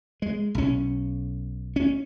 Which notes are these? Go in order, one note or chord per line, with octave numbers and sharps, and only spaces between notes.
G#3
B1 C#4
C#4